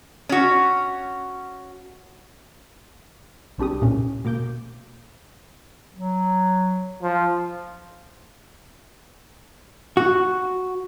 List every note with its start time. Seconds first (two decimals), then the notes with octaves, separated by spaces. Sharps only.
0.29 C#4 F#4
3.58 C2 C4 D4 G4 D#6
3.82 E2 A#2 C#3 C#4
4.25 B2 A#3 D6 G6
5.94 F#3
7.02 F3
9.97 F#4